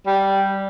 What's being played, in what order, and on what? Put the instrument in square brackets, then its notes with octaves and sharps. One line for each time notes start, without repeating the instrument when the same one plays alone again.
[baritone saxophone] G3